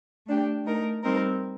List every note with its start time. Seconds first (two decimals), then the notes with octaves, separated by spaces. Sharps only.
0.27 A3 D4 G4
0.65 A3 D#4 A#4
1.03 G3 C4 D#4 A#4